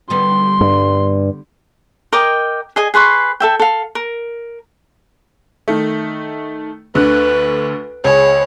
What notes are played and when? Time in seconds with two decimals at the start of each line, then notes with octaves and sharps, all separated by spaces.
0.10 D3 G3 B3 C6
0.61 G2
2.13 A#4 D#5 G5 D6
2.76 G#4 D#5 G#5
2.94 G#4 B4 C6 C#6
3.40 A4 E5 G5
3.60 A4 F5
3.95 A#4
5.68 D#3 A3
6.95 D2 D3 B4 F#6
8.04 C#2 G#4 C#5